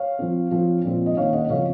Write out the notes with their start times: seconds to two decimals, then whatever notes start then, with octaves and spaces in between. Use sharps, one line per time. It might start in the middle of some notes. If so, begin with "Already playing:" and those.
Already playing: C#5 F5
0.19 F3 C4
0.51 F3 C4
0.84 A#2 F3 G#3 C4
1.06 D#5
1.17 D#3 A#3 C#4 C#5 F5
1.33 D#5 F#5
1.45 D#5
1.50 C#3 F3 C4 C#5 F5